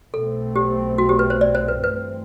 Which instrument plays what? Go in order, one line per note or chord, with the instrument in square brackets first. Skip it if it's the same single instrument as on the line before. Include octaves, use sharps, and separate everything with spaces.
[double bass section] B1 B2 A3 C4 [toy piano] A4
[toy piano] G4
F#4
G4
B4
C5
D5
C5
B4
[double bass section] G2 E3 A3 C4 [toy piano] B4